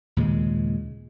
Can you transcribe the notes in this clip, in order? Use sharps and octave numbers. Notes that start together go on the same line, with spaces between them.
D#2 A#2 C#3 G#3